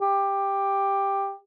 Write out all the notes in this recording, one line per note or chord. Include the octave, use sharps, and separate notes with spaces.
G4